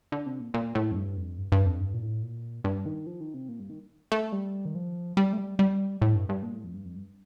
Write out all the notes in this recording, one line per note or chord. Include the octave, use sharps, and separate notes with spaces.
D3
C3
A#2
A#2
A2
F2
G2
F2
G2
G2
F2
G2
A#2
A2
A#2
G2
D#3
F3
D#3
C3
A#2
G2
D#3
A3
G3
D#3
F3
G3
A3
G3
G3
A2
G2
G2
A#2
A2
F2
G2
F2
G2